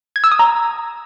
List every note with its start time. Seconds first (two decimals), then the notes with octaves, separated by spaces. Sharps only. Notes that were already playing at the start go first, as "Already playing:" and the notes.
0.16 G#6
0.24 E6
0.32 D#6
0.39 A#5